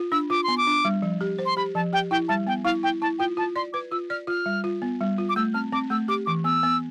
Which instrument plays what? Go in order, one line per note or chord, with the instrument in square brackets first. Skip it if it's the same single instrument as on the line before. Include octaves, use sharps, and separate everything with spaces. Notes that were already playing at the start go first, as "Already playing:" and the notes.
Already playing: [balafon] F4
[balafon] D4 [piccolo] E6
[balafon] F4 [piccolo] D6
[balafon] B3 [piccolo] C6
[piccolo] D6
[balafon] D4
G3
F3
G4
C5
[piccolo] C6
[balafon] G4 [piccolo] B5
[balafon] F3 [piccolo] A5
[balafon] G4 [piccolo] G5
[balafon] E4 [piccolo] G5
[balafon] G3 [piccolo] A5
[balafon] B3 [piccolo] G5
[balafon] E4 [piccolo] F5
[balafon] E4 [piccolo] G5
[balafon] E4 [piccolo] A5
[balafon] F4 [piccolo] G5
[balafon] F4 [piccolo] A5
[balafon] D5 [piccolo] C6
[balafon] B4 [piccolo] D6
[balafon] F4 [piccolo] E6
[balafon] D5 [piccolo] F6
[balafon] F4 [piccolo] F6
[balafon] G3
F4
B3
G3
F4
[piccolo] D6
[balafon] A3 [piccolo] E6
[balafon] C4 [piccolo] F6
[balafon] C4 [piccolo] D6
[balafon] A3 [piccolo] E6
[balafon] G4 [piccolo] D6
[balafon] E3 [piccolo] D6
[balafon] B3 [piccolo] E6
[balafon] B3